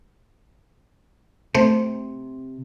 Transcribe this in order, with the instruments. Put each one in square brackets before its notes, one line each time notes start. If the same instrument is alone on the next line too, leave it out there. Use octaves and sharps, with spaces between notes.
[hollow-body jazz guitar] C3 [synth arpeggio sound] A3 C5